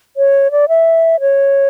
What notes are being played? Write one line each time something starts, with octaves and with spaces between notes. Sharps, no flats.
C#5
D5
E5
C#5